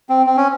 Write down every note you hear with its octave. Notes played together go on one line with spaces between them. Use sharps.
C4
C4
C#4